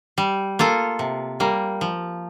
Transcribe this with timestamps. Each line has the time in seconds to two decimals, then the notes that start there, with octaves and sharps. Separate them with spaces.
0.18 G3
0.59 A#3 F4 A4
0.99 C3
1.40 G3 A#3
1.81 F3